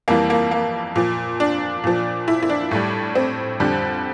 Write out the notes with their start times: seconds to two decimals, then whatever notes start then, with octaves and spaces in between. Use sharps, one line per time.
0.08 F2 E3 G3 A#3
0.30 A#3
0.51 A#3
0.96 A#2 F3
1.40 D4
1.84 A#2 F3
2.28 E4
2.43 E4
2.50 D4
2.71 A2 G3
3.15 C4
3.60 F2 D3 G3